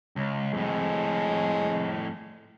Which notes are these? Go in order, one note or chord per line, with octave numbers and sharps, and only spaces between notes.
C#2
F2 A2 G#3